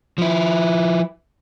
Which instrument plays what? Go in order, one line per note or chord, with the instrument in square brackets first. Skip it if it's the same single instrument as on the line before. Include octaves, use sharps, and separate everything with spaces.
[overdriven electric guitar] F3 E4